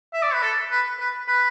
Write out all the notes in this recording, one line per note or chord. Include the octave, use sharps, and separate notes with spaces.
E5
D5
B4
A4
B4
B4
B4